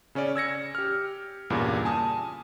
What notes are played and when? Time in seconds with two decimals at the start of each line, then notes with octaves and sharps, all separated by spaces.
0.15 C#3 C#4 C#5 D5
0.36 E6 G#6 A#6 C#7
0.75 G4 F6
1.50 E2 G2 A#2 C#3
1.85 G#5 A5 D#6